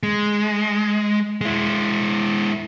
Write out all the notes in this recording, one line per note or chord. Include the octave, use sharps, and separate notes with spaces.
G#3
G#3 E4